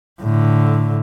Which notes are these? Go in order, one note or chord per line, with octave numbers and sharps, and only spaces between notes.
A2 D3